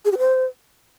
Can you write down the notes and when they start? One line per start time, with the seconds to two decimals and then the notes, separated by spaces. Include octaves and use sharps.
0.05 G#4
0.12 G4
0.18 C5